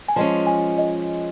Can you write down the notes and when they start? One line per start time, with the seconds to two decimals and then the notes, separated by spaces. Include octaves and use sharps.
0.08 G#5
0.16 F3 G#3 C#4 A5
0.47 G#5
0.78 D#5